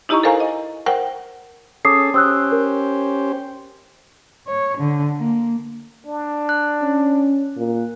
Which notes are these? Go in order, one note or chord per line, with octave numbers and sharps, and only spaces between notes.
D#4 E4 G4 D#5 A#5 C#6
A4 A#4 C5 F5 G#5 A#5
D#5
A#4 C5 F#5 G5
C#4 G#4 A4 D6 D#6 C7
C#4 G4 C5 D#6 E6 F#6
A#4
C#5
D3
A#3
D4
F#6
C#4
A#2